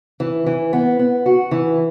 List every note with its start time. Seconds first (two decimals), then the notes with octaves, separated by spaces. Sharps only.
0.20 E3
0.46 E3
0.73 B3
0.99 B3
1.26 F#4
1.51 E3